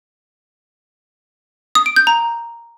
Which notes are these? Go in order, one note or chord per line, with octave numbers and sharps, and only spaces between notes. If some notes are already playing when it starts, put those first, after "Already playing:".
D#6
D7
G6
A#5